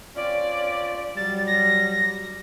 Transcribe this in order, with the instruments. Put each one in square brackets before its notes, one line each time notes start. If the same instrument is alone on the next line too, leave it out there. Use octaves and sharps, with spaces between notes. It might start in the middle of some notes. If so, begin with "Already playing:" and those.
[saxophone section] C4 C#4 F4 [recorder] D5
[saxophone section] F#3 G3 [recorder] A6
[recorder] A#6